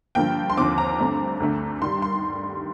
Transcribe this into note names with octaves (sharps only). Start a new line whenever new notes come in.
G2 D3 F3 A#3 G5
C6
D#2 D3 F3 C4 D6
A#5
G2 D3 A3 C4
D2 D3 A3
G2 D#3 G3 C6
C6